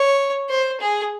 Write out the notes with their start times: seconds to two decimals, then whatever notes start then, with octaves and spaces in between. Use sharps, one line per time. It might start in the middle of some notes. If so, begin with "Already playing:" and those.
Already playing: C#5
0.49 C5
0.80 G#4